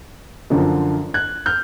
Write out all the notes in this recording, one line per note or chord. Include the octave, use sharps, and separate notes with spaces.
F#2 D3 F3
F#6 G#6
F6 G6